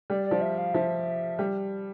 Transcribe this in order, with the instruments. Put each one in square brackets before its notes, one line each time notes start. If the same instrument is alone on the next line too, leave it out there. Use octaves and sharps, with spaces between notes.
[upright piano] G3 [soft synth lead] D5
[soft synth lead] D5
[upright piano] F3
[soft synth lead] E5
F5
[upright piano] F3 [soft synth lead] E5
[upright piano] G3